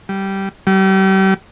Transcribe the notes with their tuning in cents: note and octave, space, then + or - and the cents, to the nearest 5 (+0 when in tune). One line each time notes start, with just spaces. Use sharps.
G3 -10
G3 -35